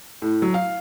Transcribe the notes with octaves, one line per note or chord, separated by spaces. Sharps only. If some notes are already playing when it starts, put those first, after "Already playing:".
A2
F#3
F5